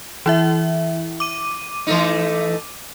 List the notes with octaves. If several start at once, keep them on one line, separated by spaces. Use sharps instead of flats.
E3 E4 E5
D6 D#7
E3 A3 D#4